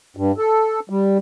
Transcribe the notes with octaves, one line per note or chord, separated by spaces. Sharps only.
G2
A4
G3